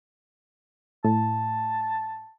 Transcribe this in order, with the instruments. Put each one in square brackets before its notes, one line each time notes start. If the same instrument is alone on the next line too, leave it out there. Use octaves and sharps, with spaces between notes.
[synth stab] A2 [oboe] A5